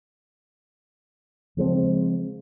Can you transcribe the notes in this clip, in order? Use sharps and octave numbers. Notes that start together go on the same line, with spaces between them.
C#3 F3 G#3 C4